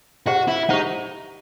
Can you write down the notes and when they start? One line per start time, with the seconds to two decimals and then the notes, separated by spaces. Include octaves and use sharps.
0.27 F#4 G4 C5 F#5
0.48 E4
0.69 D#4 G4 C5 F#5